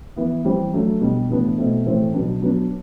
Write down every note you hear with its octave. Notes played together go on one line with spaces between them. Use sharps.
E3 B3 E4
E3 G3 C4 E4
F#3 A3 D4
B2 G3 D4
A2 E3 B3 D4
B2 A3 C4 E4
A2 E3 A3 C4
B2 F#3 B3 D4
F#3 B3 D4